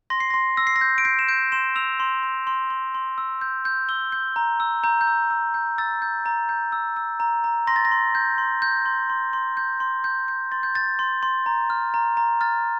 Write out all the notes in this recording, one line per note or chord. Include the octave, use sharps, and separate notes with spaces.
C6 A#6
C7
C6 A#6
E6 A#6
C7
A#6
G6
D7
G6 C7
E7
G6 D7
C6 E7
E6 F7
C6
C6
C6
C6
C6
E6
G6
G6
E6 G7
G6
A#5
E6
A#5 G6
G6
E6
E6
G6
E6 A6
G6
A#5
G6
E6
E6
A#5
A#5
C6 A#6
A6
A#6
C6
G6
C6
G6
C6
C6
C6
G6
C6
G6
G6
C6 A6
G6
G6 A6
C6
C6
A#5
F6
A#5
A#5
F6 A6